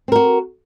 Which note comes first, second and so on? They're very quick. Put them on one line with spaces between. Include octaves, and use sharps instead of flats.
C4 A#4 F#4